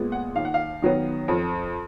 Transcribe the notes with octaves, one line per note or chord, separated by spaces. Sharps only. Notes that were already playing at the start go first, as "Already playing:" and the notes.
Already playing: A#2 G#3 B3
F#5
D#2 F5
F#5
F5
D#3 F#3 B3
F2